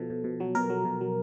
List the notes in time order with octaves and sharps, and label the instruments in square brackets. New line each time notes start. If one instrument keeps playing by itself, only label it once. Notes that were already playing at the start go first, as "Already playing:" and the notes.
Already playing: [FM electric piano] B2 F3 A4
B2
B2
F#3
B2 A#4
F#3
B2
F#3